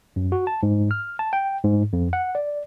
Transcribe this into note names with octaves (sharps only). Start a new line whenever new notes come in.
F#2
F#4
A5
G#2
F6
A5
G5
G#2
F2
F#5
D5